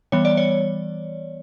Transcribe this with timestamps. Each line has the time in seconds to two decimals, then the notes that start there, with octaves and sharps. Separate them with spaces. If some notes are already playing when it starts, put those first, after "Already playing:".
0.12 E3 G3 B3 C#5
0.25 D5
0.37 C#5